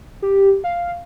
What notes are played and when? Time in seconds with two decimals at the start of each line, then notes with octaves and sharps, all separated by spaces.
0.22 G4
0.64 F5